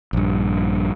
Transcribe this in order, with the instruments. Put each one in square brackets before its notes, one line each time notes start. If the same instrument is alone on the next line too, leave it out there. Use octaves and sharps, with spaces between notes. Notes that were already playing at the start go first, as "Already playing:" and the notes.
[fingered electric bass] A#1 G2